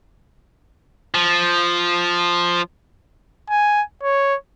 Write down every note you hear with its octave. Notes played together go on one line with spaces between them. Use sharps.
F3
G#5
C#5